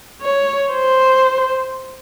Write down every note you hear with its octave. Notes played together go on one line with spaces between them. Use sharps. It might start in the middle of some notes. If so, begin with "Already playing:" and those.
C#5
C5